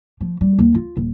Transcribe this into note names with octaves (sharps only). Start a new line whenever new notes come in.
F3
G3
D#2
F4
D#1